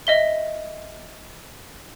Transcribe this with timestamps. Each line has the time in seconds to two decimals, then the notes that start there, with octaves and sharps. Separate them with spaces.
0.07 D#5 E5 G7